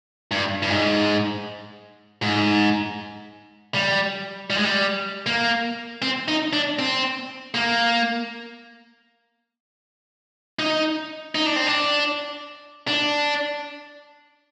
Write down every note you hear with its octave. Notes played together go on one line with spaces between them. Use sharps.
G2
G2
G#2
G#2
G3
G3
G#3
G3
A#3
C4
D#4
D4
C4
A#3
D#4
D#4
D4
C4
D4
D4